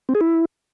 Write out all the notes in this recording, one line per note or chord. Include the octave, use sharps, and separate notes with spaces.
C4
G#4
E4